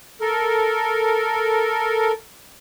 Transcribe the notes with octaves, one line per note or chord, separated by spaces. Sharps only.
A4 A#4